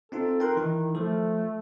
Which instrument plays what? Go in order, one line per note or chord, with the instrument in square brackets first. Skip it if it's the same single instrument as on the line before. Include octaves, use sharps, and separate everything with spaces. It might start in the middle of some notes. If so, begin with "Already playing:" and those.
[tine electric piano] C4 D#4 F4 [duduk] A4
[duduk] A#4 [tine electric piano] G5 C6 F#6
[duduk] D#3 [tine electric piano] E3 D#4 E4
[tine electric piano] F3 A4 [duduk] A3